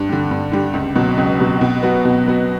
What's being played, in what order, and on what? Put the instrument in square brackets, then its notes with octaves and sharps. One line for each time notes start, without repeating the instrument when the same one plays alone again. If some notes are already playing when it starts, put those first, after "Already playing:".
Already playing: [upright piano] G2
D3 G3
G2
D3 G3
C#2
B2 F#3
C#2
B2 F#3
B2
F#3 B3 F#4
B2
F#3 B3 F#4